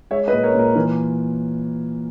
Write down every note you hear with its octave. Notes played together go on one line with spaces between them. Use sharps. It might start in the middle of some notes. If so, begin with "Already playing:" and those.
G#3 C#5 E5
B4 D#5
A#2
A#4 C#5
A#2 A#4
E3 A#4